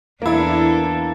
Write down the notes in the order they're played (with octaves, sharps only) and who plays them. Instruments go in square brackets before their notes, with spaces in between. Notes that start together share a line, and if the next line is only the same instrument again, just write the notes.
[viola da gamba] E2 D4 A4 [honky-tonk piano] A#3 E4